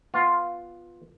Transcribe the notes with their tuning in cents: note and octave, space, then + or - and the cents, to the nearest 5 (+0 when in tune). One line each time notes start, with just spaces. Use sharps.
B3 +0 F4 +0